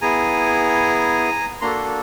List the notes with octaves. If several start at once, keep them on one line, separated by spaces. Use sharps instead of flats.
B3 E4 G#4 G#5 A#5
A#3 D4 F#4 A4 A#5 C6